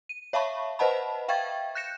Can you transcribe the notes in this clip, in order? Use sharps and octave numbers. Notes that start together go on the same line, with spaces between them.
D#7
C#5 E5 F5 A5 B5 C#6
B4 C5 D#5 F#5 A5 B5
E5 F5 G5 C#6 G#6 A6
F#6 G6 A#6 C#7 E7